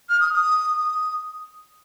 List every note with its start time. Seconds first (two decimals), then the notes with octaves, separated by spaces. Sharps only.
0.09 F6
0.20 D#6
0.33 D#6